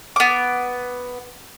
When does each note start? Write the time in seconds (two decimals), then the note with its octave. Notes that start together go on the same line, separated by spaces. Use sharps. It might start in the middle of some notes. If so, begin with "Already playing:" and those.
0.16 B3 D6